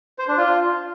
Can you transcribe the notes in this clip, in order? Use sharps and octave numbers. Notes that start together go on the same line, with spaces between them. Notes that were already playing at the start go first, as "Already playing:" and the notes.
C5
D4
F4